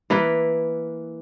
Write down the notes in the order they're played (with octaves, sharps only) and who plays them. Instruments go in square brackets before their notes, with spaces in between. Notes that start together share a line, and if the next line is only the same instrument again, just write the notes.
[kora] E3 A#3 E4 B4